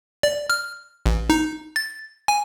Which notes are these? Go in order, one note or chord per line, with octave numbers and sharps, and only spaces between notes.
D5
F6
A1
D#4
A6
G#5